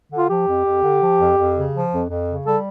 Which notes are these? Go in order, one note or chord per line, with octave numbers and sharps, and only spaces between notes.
D3
F4
F3 G4
F2
F2
D3
F3
F2
F2
C#3
F3
F2
F2
C#3
G3 A4